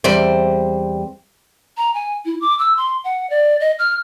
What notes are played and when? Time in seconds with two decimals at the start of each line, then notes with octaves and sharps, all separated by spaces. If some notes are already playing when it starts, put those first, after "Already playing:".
0.04 E2 G3 C4
1.77 A#5
1.94 G#5
2.26 E4
2.41 D6
2.59 E6
2.77 C6
3.04 F#5
3.30 D5
3.60 D#5
3.79 F6